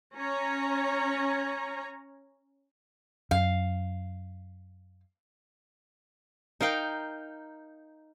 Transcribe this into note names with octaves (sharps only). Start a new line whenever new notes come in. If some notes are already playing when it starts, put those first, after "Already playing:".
C#4 C#5 A#5
F#2 F5
D#4 A#4 F5 G5